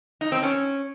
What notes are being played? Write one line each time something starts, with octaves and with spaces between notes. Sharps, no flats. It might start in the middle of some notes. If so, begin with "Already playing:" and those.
D#4
C4
C#4